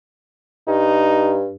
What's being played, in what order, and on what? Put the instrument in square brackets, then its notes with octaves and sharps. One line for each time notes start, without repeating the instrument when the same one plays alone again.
[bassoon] G2 [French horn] D#4